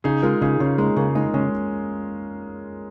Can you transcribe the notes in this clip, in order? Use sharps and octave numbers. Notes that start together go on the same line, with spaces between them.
C#3 D#4 G#4
G#3 F4 A#4
C#3 D#4 G#4
C#3 C#4 F4
G#3 A#3 D#4
C#3 A#3
G#3 D#4
C#3 G#3 C#4